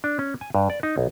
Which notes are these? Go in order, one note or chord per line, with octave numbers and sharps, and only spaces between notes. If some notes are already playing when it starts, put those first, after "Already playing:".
D4
C#4
G#5
G2
D5
D#4
B1